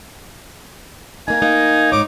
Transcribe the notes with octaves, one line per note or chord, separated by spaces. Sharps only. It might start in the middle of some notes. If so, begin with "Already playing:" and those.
A#3 D#4 G#5
A#3 D#4
G#2 C#5 D6